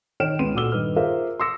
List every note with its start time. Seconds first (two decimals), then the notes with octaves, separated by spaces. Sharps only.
0.20 D#3 C#5 G5 F6 D7 E7
0.39 C#2 C#3 B3 C6 D#7
0.54 A#2 F#4 A4 D6 E6 G7
0.72 G2 D#3 B4 F6
0.96 F4 G#4 A#4 C5 E5 F5
1.40 C6 D6 E6 A#6 C#7